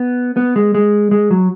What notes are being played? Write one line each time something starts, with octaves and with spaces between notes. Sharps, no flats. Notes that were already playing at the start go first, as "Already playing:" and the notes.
Already playing: B3
B3
G#3
G#3
G#3
F#3